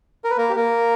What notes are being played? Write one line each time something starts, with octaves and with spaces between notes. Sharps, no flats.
A#4
B4
A#3 A#4
G4
A#3 A#4